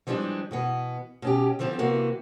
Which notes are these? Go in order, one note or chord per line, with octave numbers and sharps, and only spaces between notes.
E3 F3 G3 G#3 D4
B2 E3 B3
B2 C#4 G4
D3 E3 F3 C4
C3 E3 A#3 F#4